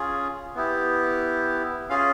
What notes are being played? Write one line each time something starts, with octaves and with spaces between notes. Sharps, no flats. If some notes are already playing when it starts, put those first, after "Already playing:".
Already playing: C#4 F4 G#4
B3 E4 G4
C#4 F4 G#4 F5